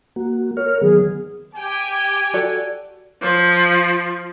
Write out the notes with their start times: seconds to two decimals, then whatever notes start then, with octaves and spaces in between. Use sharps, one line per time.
0.16 A#3 F#4
0.57 A#4 C#5 F6
0.81 D#3 F#3 B3 G#4
1.55 G4 G5 G#5
2.34 F#4 A4 D5
3.22 F3